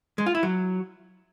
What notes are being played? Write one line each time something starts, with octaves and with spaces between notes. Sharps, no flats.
G#3
F4
E4
F#3